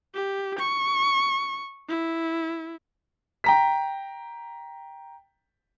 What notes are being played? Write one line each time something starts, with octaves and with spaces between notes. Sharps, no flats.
G4
C#6
E4
G5 A#5 B6